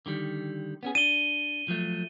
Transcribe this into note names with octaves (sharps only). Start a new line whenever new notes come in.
D3 D#3 G3
B3 C#4 G#4
D4 D#7 G7
F3 F#3 A3